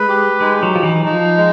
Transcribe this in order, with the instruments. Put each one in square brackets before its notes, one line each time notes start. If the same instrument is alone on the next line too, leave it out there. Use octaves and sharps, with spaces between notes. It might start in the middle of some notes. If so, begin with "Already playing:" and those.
Already playing: [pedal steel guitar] G#3 [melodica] B4
[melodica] G4
[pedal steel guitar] G#3 [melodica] D#4
[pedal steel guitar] F#3
[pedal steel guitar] F3 [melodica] D#4
[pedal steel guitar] E3
[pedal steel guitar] F3 [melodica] D#4
[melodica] G#3